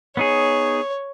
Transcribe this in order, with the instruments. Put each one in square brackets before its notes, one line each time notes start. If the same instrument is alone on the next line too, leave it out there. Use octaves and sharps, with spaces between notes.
[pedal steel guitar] B3 D#4 G#4 [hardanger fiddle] C#5